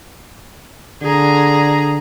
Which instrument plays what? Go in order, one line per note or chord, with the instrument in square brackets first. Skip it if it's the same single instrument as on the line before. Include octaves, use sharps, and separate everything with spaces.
[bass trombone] D3 [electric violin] G#4 A#5